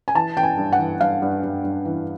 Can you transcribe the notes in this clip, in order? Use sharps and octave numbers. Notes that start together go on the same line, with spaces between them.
G#5
E3 A5
E3 G5
G#5
G2
F#5
E3
G2 F5
G2
G2
G2
E3